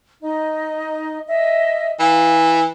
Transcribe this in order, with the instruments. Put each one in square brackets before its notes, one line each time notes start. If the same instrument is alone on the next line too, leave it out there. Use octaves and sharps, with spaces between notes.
[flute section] D#4 D#5
D#5 E5
[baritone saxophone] E3 [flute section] F5